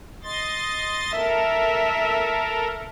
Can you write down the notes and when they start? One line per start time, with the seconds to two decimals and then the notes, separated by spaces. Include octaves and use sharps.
0.24 D#5 C6 A6
1.12 A4 A#4 E5